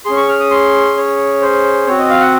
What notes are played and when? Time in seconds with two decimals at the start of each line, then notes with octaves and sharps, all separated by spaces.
0.05 C#4 G#4 C6
0.17 C#6
0.28 F6
0.40 D#6
0.51 C6
0.96 C#5
1.42 C5
1.87 C4 F#4 C#5
1.99 D#5
2.10 F5
2.21 F#5